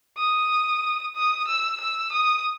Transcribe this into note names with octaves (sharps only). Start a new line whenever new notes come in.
D#6
D#6
E6
E6
D#6